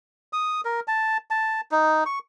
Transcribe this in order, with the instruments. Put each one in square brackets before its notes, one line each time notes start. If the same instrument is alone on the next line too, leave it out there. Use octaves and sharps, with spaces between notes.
[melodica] D#6
A#4
A5
A5
D#4
C#6